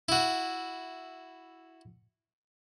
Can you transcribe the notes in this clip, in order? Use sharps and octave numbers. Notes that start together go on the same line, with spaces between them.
E4 F#4